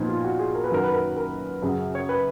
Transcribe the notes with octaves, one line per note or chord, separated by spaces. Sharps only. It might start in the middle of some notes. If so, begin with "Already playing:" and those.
Already playing: A#2 F3 B3 D#4
F4
F#4
G#4
A#4
B4
F#2 D#3 F#3 A#4
B4
A#4
A#4
F#2 C#3 F#3
C#5
B4